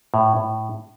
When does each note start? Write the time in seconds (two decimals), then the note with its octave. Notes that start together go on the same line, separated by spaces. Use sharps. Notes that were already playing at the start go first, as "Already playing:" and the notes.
0.14 A2
0.37 A2